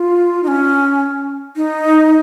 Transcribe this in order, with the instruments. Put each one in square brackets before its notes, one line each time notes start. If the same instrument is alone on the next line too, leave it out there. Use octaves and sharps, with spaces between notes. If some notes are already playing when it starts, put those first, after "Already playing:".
Already playing: [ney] F4
D#4
C#4
D#4